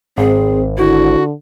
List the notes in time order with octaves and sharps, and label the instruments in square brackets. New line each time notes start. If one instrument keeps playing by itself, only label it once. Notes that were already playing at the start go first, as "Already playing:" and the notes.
[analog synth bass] G#1 [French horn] C4 [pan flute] G#4
[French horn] D3 [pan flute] E4 [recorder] F#4